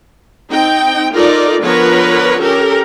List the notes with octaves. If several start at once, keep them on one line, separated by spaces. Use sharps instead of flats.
C4 D#4 G5
D#4 F4 A4 A#4 D5
D3 F3 B3 A#4 B4 C#5
C#4 G4 A4 A#4